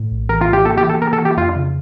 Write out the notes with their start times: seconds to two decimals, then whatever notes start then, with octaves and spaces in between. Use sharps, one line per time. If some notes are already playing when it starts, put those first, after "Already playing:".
Already playing: A2
0.11 A#1
0.29 E3 A#4
0.41 F4
0.47 A2
0.53 G4
0.65 A#3 A4
0.77 G4
0.84 E3
0.89 A4
1.01 A#3 A#4
1.13 A4
1.20 E3
1.25 G4
1.37 F2 F4
1.56 C#3